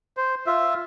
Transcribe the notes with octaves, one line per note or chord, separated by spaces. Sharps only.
C5
F4 E5